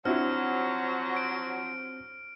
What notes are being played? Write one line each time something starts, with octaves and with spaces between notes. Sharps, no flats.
F3 F#3 C4 D4 E4 F#4 C5 F6
D7